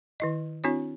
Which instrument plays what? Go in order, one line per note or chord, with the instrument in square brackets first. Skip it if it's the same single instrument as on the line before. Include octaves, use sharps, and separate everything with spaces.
[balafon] D#3 E4 D#5
C4 D4 E4 F#4 C#5